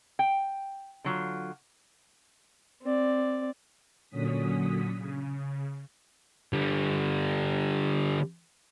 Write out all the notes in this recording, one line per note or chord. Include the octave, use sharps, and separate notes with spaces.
G5
D3 F#3 F4
C4 D5
A#2 D3 F#3 C#4 D#6 B6
C#3
D3 G3